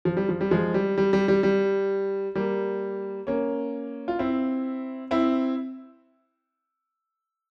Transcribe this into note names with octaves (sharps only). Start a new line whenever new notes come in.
F3
G3
F3
G3
F3 G#3
G3
G3
G3
G3
G3
G3 A#3
A#3 C#4
F4
C4 E4
C4 E4